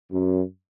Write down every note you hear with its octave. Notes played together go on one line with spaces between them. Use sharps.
F#2